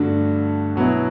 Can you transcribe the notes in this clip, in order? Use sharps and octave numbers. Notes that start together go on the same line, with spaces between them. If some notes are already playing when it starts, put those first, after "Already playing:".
Already playing: G2 D3 A3 D4 F#4
B2 F#3 B3 E4